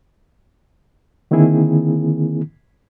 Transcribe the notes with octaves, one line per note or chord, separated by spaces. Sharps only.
D3 D#3 A#3 C4 E4 G#4